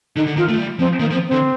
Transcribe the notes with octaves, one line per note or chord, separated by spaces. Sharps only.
D3 D#4
D3
D#3 F4
A3
G3
F3 C4
D#3 A#3
F3
C4
D3 C4